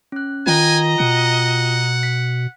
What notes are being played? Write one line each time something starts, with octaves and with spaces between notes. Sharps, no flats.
C#4 F#6
D#3 F4 D#5 G5 G#5 A#5
B2 F#5
B6